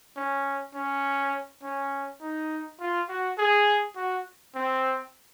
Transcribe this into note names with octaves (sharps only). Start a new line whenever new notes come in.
C#4
C#4
C#4
D#4
F4
F#4
G#4
F#4
C4